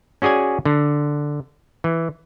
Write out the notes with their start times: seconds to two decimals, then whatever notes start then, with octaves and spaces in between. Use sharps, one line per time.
0.22 C#4 F#4 G#4 D5 G#5
0.65 D3
1.84 E3